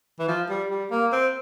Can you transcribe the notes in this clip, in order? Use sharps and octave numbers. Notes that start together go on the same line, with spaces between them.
E3
F3
G3
G3
A#3
C4